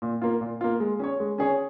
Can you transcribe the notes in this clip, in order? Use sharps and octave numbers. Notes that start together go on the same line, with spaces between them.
A#2
A#3 F4
A#2
A#3 F4
G#3
C#4 G#4 C#5
G#3
C#4 G#4 C#5